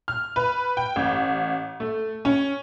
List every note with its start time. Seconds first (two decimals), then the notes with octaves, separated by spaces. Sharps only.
0.08 F6
0.36 B4
0.77 G5
0.96 A1
1.80 A3
2.25 C#4